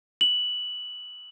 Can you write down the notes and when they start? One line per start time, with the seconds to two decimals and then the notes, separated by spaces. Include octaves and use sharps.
0.21 F#7